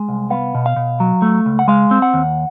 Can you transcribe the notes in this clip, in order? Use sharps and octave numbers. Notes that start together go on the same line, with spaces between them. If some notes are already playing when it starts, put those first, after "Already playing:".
Already playing: G#3
C2
B3 F5
B2
F5
B2
F#3
A3
C#2
F#5
G#3 F5
C4
F#5
D#2